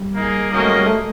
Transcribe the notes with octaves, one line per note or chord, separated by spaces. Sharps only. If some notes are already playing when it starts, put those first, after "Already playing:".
Already playing: G3
A#3 D#4 G#4
A#3 C#4 F#4 A#4 D#5
A3
G#3
G3
A3